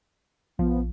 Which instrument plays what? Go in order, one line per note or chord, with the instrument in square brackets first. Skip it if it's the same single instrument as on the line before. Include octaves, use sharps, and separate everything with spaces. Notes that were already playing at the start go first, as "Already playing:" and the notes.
[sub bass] A#1 [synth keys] F3 [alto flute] B3